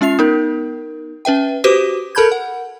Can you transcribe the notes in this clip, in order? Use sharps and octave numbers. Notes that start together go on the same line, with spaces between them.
G#3 C#4 F4 E5 C7 F7
B3 D#4 A#4
C#4 B4 E5 G5
F#4 G4 B4 C5 D6 D#6
A4 A#4 A5 B5 G6 G#6
F#5